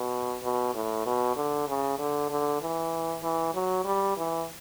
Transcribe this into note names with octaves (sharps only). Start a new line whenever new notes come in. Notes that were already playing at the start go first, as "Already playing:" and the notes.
Already playing: B2
B2
A2
B2
D3
C#3
D3
D3
E3
E3
F#3
G3
E3